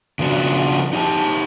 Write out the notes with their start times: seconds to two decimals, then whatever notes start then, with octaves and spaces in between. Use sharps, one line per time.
0.19 C#3 F3 B3 D4 F#4
0.93 D#4 G4 A5